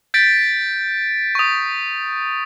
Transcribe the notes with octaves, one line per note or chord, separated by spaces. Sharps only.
G6 A6 B6 D7
C#6 D#6